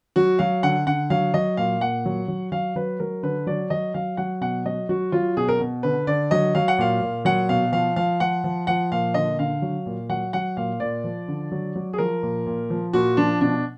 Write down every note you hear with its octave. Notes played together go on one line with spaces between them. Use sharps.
F#3 F#4
F#3 F5
D3 F#5
D3 F#5
F#3 F5
F#3 D#5
A#2 F5
A#2 F#5
F#3
F#3
F#3 F5
F#3 B4
F#3 A#4
D3 B4
F#3 D5
F#3 D#5
F#3 F5
F#3 F#5
B2 F#5
F#3 D#5
F#3 F#4
F#3 F4
B2 G#4
A#4
B2
D3 B4
D3 D5
F#3 D#5
F#3 F5
F#5
A#2 F5
A#2
F#3 F#5
B2 F5
F3 F5
F3 F5
F3 F#5
F3
F3 F#5
A#2 F5
D3 D#5
D3 F5
F#3
A#2
F#3 F#5
F#3 F#5
A#2 F5
A#2 D5
F3
D3
F#3
F#3
G#4
F3 A#4
A#2
A#2
F3
A#2 F#4
F3 D4
B2 D4